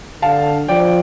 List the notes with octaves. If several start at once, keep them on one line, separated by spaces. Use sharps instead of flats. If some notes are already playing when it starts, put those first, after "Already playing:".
D3 F5 A5
F3 D5 G5